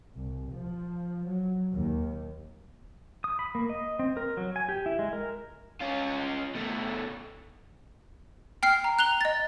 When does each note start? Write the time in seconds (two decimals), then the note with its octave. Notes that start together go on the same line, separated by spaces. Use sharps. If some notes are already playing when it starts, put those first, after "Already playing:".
0.15 C2
0.52 F3
1.27 F#3
1.73 D#2
3.24 D#6
3.39 B5
3.55 A#3
3.69 D#5
3.99 C4
4.17 A#4
4.37 F#3
4.56 G#5
4.69 G4
4.86 E4
4.99 G#3
5.13 A#4
5.80 C#4 F4
6.55 B2 A3
8.63 G5 F6 C7
8.84 A#5
8.99 F#6 F7 G7
9.21 D#5 A6